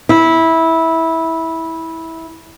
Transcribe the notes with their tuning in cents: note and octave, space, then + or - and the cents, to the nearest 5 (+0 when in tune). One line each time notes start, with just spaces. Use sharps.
E4 -15